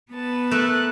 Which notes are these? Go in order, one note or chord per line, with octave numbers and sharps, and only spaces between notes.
B3 B4 A5
A3 A#4 E5 F#6